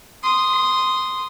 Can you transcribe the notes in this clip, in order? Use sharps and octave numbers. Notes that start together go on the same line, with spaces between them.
C6 D#6